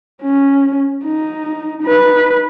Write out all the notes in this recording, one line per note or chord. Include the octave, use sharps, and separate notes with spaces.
C#4
D#4
D#4 B4